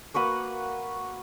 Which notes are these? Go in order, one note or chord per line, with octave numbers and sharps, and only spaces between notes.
A#3 F#4 B4 F#5